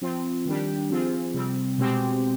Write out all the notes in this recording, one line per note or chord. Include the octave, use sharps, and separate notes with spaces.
F3 C4 F4
D#3 G3 D4 G4
F3 C4 F4 G#4
C3 G3 C4
B2 G#3 C4 G4